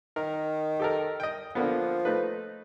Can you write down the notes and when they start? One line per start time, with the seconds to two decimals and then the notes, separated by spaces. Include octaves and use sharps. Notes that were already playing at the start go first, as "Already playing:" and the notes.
0.16 D#3 A#4
0.80 G4 A4 A#4
1.20 D#5 G5
1.55 D3 F3 A#3 B3
2.05 A3 D#4 B4